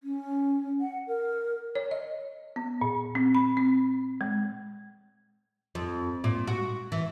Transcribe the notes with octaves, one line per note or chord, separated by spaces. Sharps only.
C#4
F#5
A#4
C#5
D#5
B3
A#2
C4
B5
C4
G#3
F2
A#2
F#4
E3